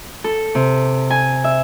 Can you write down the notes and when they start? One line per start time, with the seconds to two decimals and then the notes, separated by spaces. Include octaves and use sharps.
0.24 A4
0.55 C3
1.10 G#5
1.44 E5